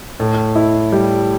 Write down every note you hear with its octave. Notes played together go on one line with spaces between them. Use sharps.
A2
E4
G3